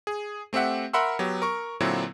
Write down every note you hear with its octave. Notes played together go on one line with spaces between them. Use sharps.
G#4
A3 C4 G4 E5 F#5
A#4 E5 F#5 B5 C6 E6
F#3 B3 G4
A#4 C#6
A#2 D3 F#3 C4 E4